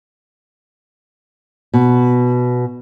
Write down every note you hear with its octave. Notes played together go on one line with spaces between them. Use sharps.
B2